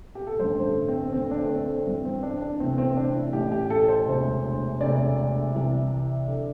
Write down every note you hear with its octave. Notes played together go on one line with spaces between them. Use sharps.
G4
A4
A1 G2 D3 C5
A3
C4
D2 D3 C4
D4
A3
C4
A3
G1 G2 E3 C4
C4
D4
D4
D2 C3 E3 C4
C4
D4
E4
A1 A2 E3 G4
G4
A4
C5
E1 D2 C3
E1 D2 C3 D5
C2 C3 E3
D3